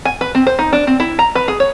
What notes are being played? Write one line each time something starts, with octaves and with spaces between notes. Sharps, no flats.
G#5
B4
C4
C5
D#4
D4
C4
E4
A#5
B4
G#4
C#5